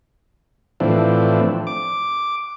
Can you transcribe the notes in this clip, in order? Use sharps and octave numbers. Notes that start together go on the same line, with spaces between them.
A2 E3 F3 C4 D4
D6